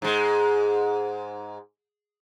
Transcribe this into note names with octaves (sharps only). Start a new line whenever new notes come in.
G#2 G#3